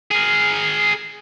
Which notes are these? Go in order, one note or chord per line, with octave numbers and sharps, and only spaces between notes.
G#4 A#4